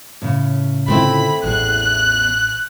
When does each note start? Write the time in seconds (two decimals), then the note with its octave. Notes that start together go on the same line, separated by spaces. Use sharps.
0.22 A2 C#3
0.88 D3 A3 C4 E4 F4 B5
1.43 A1 E2 G#4 F#6